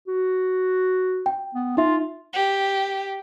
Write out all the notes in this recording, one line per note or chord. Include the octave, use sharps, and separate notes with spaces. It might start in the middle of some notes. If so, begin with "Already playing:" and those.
F#4
G5
B3
D#4 F4 E5
G4